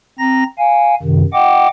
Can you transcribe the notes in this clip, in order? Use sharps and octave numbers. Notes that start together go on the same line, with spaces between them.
C4 A#5 A#6
F5 G#5
F#2 C3 D#3
D#5 F#5 G5 D6